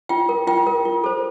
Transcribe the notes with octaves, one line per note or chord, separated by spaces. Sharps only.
F4 G5
A#4
F4 G5
A#4
F4
A4 C5